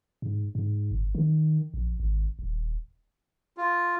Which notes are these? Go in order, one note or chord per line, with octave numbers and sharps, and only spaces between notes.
G#2
G#2
G1
D#3
A#1
G#1
D#1
F4